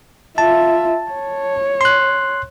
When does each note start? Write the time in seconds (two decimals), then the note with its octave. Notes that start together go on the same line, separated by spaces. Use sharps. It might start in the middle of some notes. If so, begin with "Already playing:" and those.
0.38 F4 E5 A5
1.11 C#5
1.81 C6 F#6